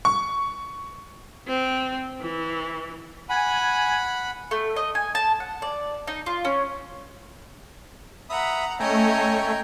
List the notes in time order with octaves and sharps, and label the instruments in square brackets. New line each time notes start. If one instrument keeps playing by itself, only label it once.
[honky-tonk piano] C#6
[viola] C4
E3
[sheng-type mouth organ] F#5 B5 [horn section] G#5
[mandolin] A3
D#5
G#5
A5
F#5
D5
D#4
F4
C#4
[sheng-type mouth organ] E5 B5 D#6 [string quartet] F#5 A#5
[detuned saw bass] A3 [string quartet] C#4 C#5 D#5 [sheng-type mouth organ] G5 G#5 A#5